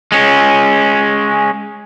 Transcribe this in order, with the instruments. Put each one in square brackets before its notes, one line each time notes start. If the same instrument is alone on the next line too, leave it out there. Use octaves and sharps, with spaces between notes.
[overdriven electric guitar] G#3 C#4